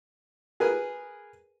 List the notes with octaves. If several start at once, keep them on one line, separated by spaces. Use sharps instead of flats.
G#4 A#4 B4 G#5